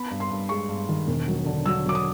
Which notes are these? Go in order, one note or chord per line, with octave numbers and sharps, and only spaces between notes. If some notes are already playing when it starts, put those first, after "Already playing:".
Already playing: B3 B5
G2
C6
G2
G#3 C#6
G2
D#3
E1
F#3
D3
F#3 E6
F#3 D6
D#6